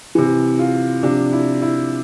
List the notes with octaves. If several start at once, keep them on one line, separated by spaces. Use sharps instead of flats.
C3 E3
F4
C3 F3 D4
E4
E4